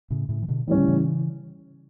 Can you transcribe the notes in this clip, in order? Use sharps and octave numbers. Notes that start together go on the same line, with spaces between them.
A2 C#3
A2 C#3
E3
B2 D3
A2 E3 G3 C#4
D3
C#3 E3